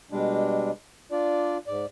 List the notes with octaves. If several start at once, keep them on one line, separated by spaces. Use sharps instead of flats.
B2 G3 G#3 D4
D4 F4 D5
G#2 D5